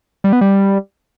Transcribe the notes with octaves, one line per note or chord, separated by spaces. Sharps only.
G3
B3
G3